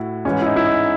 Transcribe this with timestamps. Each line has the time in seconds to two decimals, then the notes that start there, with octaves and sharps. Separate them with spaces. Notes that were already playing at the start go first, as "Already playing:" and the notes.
Already playing: A2 E4 F#4
0.25 G#2 E3 G#3 C#4
0.42 E4
0.46 D#4
0.56 E4
0.67 D#4